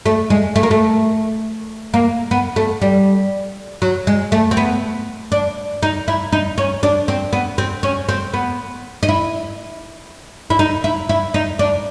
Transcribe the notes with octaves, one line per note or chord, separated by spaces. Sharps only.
A3
G#3
A3
A#3
A3
A#3
B3
A3
G3
F#3
G#3
A3
C4
B3
D4
D#4
E4
D#4
C#4
D4
C4
B3
C4
C#4
C4
B3
D#4
E4
E4
D#4
E4
E4
D#4
D4